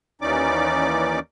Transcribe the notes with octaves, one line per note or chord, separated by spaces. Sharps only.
D#2 E3 C#4 D#4 D5 D6